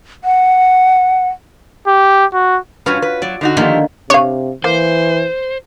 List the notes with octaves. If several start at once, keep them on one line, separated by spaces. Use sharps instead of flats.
F#5
G4
F#4
G2 C#4 F4 F#4 B4 C#5
B4
F#3 D5
D3 D#4 F#4
D3 D#3 F3 A3 A#3 G4
C3 D4 C#5 F5
E3 A#3 C5